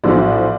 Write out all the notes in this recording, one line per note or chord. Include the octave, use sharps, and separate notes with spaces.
A#1 A2 F#3 B3 D4 C5 D5